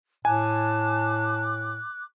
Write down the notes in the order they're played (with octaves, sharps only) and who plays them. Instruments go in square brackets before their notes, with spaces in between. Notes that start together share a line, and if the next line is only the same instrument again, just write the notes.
[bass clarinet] A2 [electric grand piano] G#5 [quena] A5 [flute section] D6 F#6